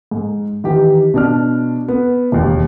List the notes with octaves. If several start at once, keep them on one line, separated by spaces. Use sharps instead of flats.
G#2
D#3 E3 G4
B2 D4 F6
B3
E1 D#2